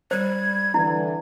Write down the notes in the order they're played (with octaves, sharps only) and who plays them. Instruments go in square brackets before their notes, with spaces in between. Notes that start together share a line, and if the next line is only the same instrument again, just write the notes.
[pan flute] G3 [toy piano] C5 [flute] G#6
[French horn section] D3 E3 [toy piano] E4